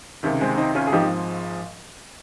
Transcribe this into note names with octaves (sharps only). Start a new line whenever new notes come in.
C#2 C3 D#3
G#3 C4
C4 D#4
C#4 F4
G#4
G#1 G#2 F3 D#4 G4